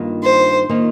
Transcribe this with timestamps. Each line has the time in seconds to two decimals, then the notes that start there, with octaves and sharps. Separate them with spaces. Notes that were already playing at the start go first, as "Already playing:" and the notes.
Already playing: G2 D#3 A#3 F4
0.23 C5
0.69 D#3 A#3 F4